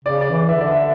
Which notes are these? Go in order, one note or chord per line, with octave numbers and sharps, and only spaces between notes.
C#3 D5
D5
E3
E3 E5
D3
D5
E5